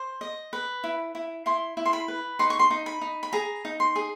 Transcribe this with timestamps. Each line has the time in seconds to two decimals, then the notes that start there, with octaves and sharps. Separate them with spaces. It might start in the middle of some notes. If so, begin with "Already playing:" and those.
Already playing: C5
0.21 D#5
0.53 B4
0.84 E4
1.15 E4
1.46 E4 C6
1.77 E4
1.85 C6
1.93 B5
2.08 B4
2.39 D#4 C6
2.50 C#6
2.59 C6
2.70 D#4
2.86 B5
3.01 D#4
3.23 B5
3.33 G#4 A#5
3.65 D#4
3.80 C6
3.96 G#4